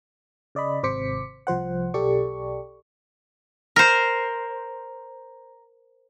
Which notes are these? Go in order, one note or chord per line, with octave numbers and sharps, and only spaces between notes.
C#3 D5 D#5 B5
G#1 C3 C5 D6 B6 C#7
C2 F3 C5 F#5
B1 G4 A4 D5 C#6
A#4 C5